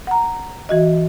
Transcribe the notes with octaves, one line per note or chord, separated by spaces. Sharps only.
F#5 A#5
E3 F#4 D#5